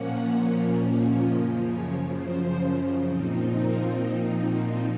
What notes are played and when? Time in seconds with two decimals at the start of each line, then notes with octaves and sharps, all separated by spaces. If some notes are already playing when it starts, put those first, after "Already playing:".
Already playing: A#2 F3 A#3 C#4 F#5
1.20 F#2 C#3 F3 D#5
1.67 C#5
2.12 C5
3.03 A#2 F3 C4 D#4
3.49 A#4
4.39 F#4